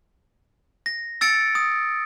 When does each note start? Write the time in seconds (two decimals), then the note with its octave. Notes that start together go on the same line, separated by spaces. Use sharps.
0.86 A#6
1.21 E6 A6 C#7 D7
1.55 D#6